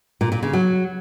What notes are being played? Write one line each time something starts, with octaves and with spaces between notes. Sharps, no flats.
A#2
A#2
C#3
F#3